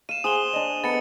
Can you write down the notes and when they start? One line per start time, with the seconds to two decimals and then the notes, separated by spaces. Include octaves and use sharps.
0.09 F5 D#7 E7
0.24 G#4 C5 F#5 D#6 E7 G7
0.36 E7
0.53 D4 D#5
0.84 B3 A4 A#5 A6 C#7